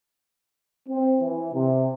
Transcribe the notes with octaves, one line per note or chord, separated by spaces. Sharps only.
C4
E3
C3